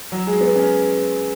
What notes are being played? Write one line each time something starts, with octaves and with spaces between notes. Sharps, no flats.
F#3
G#3
B3
C#4